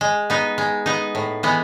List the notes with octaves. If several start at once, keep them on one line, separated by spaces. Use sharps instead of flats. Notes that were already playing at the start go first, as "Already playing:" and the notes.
G#3
B3 D#4
G#3
B3 D#4
A2
E3 G#3 B3